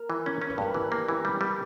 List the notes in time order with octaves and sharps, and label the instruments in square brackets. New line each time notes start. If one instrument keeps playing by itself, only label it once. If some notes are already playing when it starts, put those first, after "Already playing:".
Already playing: [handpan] A#4
[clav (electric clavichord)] E3
C#4
C#4
[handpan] B4
[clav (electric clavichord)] G2 [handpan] A#4
[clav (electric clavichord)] E3 [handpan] G4
[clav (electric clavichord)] A#3
E3
G3
G3